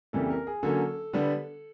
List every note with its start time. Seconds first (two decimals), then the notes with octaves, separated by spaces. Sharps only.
0.13 F2 C#3 E3 G3 A#3 A4
0.30 A#4
0.47 G#4
0.63 D3 F#3 A#3 C#4 A4
1.13 D3 G3 B3 D4